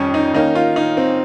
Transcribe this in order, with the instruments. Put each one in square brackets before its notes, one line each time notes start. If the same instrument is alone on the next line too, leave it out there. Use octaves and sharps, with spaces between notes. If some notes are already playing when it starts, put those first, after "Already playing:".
Already playing: [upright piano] F2 D#3 G3 [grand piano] C#4
[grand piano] D#4
[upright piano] D#3 A#3 C#4 [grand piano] D#4
[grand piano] F4
D#4
C4